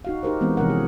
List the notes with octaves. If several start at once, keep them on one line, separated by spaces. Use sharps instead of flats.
D#4 F#4 F5
D#4 G4 A#4 C5
E3 G#3 B3 C4
C3 E3 F3 C#4 A#4 F#5
G#4